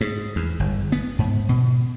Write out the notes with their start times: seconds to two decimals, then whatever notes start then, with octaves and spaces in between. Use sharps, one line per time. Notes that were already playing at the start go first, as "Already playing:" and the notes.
0.01 G#2
0.36 E2
0.60 G1
0.92 B3
1.19 G#2
1.49 B2